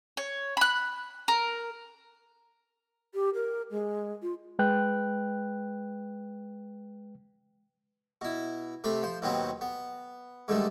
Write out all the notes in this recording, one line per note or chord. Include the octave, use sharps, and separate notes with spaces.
C#5
B5 F#6
A#4
G4
A#4
G#3
F4
G#3 B4 G5 F#6
B2 E4
C3 A3 F5 B5
F3 C5
D#2 B2 D#3 F#3 B3 C4
B3
G#2 D3 D#3 G3 A3